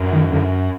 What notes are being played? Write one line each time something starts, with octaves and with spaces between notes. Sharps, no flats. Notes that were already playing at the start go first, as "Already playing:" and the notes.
Already playing: F#2
D#3
F#2 D3